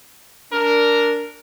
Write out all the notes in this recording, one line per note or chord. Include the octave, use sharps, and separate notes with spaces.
D4 A#4